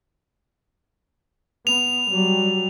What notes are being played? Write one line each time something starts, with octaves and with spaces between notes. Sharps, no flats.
B3 F7
F#3 G3